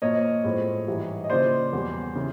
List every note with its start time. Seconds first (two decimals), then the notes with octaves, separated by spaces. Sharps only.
0.02 A#2 F3 A#3 C#5 D#5
0.44 A2 F3 G#3 C4
0.87 G#2 E3 G3
1.24 D#5
1.30 C#3 F3 A#3 C5 D5
1.73 E2 B2 G3
2.15 C#3 E3